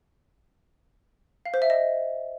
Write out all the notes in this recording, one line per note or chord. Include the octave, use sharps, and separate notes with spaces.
F5
C5
E5
D#5